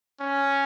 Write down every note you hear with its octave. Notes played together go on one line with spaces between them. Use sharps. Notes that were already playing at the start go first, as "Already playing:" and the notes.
C#4